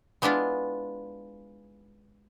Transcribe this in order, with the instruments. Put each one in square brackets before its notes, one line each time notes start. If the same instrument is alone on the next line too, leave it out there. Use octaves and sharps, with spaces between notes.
[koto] G#3 B3 D4 E4 F4